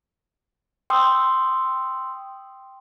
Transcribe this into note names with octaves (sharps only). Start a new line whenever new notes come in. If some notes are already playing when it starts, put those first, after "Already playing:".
G5 C6 D#6 E6